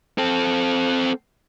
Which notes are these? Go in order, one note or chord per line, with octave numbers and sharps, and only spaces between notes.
C4 A4